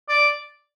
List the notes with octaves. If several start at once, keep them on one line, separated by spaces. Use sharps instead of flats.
D5